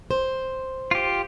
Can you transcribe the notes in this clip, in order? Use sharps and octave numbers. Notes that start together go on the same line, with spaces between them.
C5
F4 G4